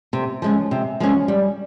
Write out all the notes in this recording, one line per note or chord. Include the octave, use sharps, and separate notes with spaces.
C3
F3 G#3 C#4
C3
F3 G#3 C#4
G3